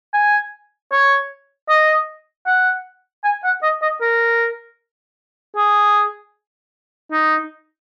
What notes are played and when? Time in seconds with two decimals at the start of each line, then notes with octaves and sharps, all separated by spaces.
0.14 G#5
0.92 C#5
1.69 D#5
2.46 F#5
3.24 G#5
3.44 F#5
3.63 D#5
3.82 D#5
4.01 A#4
5.56 G#4
7.12 D#4